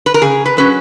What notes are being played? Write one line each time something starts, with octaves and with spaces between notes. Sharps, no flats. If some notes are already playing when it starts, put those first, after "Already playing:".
B4
A#4
C#3 G#4
B4
F#3 C#4 B4